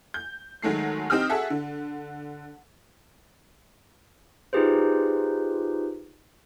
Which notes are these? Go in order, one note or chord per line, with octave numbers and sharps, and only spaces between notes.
G6
D#3 F#3 G#3 A3 C7
C4 D#4 G4 D#6 F6
F#4 G#4 A4 E5 F#5
D3
D#4 F4 G4 G#4 B4 C5